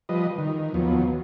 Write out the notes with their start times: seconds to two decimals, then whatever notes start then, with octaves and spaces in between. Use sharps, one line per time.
0.09 F3 G3 B4 D#5
0.38 D#3
0.74 D#2 F3 F#3 B3